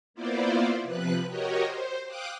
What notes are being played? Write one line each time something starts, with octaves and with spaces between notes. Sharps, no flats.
A#3 B3 E4 F4 C5 D5
C3 F3 B4 F#6
F#4 G4 A#4 C#5 D#5
C5
F5 G5 D6 D#6 F#6